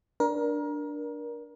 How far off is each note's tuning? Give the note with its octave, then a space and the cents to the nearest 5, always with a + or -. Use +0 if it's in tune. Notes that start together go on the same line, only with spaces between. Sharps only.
D4 +0 A#4 +25